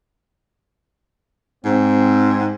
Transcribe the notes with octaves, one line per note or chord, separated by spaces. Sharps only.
G#2 C4